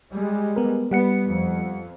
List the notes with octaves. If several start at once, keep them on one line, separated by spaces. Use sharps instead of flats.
G3 G#3
B3 A#4
G3 B3 F#5 C#7
F2